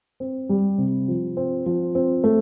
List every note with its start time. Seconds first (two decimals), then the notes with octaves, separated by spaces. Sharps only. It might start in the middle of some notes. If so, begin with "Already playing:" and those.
0.20 C4
0.49 G3
0.78 C3
1.08 F3
1.37 C4
1.66 F3
1.95 C4
2.24 A3